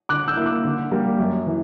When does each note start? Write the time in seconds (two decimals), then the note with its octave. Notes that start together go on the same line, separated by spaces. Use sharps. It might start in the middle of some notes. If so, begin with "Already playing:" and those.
0.09 D3 D6 F#6
0.28 E6 G6
0.37 A#3 E4
0.46 D6 F#6
0.64 D3
0.91 G3 A#3
1.19 F#2
1.46 E3